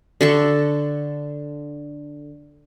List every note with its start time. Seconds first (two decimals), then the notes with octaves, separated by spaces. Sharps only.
0.21 D3 A4 C#6